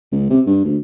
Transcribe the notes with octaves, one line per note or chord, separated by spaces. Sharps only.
C#2
C3
G2
D2